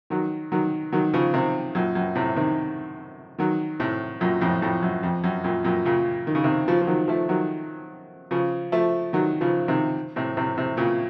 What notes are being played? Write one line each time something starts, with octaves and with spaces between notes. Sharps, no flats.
D#3 F#3
D#3 F#3
D#3 F#3
C#3 F3
C3 D#3
F#2 A#2
F#2
A2 C3
C3 D#3
D#3 F#3
A2 C3
F#2 A#2
F2 A2
F2 A2
F#2
F2
F#2
F#2 A#2
F#2 A#2
A#2 C#3
D#3
C#3
C3 D#3
C#3 F3
F3
D#3 F#3
F3 A3
D#3 F#3
C#3 F3
F3 A3
D#3 F#3
C#3 F3
C3 D#3
A2 C3
A2 C3
A2 C3
A#2 C#3